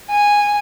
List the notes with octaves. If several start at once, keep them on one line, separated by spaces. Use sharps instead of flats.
G#5